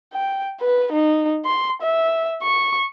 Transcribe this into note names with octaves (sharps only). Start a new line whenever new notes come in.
G5
B4
D#4
C6
E5
C#6